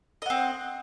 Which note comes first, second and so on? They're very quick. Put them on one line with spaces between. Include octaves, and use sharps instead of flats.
D#5 F#5 C4